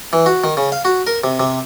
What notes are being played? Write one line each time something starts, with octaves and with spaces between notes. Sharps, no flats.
E3
F#4
D#3
C#3
F5
F#4
A#4
C3
C3